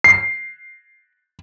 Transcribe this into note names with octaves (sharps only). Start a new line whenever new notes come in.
C7